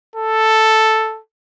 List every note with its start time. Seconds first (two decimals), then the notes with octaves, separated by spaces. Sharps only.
0.16 A4